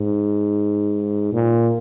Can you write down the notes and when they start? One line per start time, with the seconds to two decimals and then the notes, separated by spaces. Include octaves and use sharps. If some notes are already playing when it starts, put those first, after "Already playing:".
Already playing: G#2
1.33 A#2